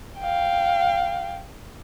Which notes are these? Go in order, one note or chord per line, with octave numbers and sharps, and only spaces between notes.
F5 G5